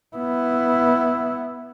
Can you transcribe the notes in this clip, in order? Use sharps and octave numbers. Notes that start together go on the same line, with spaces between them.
B3 E4